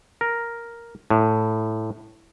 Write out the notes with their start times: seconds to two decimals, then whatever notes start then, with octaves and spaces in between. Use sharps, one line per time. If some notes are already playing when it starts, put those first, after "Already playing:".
0.21 A#4
1.10 A2